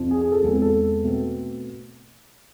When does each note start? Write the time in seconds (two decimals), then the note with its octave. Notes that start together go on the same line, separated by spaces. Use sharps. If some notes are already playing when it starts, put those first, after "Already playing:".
Already playing: F2 C3 F3
0.11 G#4
0.21 G#4
0.32 A4
0.42 E2 C3 G#3 A4
0.52 G#4
0.62 A4
1.03 B2 A3 C4